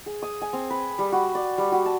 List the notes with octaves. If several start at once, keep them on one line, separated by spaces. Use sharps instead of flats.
G#4
D#6
G#5
C4
B4
G3
F#4
D5
G3
F#4
A5